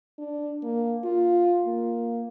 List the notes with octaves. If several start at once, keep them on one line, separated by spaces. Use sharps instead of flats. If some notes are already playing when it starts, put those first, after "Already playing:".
D4
A#3
F4
A#3